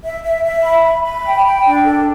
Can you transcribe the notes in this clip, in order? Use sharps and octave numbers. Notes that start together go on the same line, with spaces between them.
E5
E5
E5
B5
B5
B5
G5
G5
D4
A4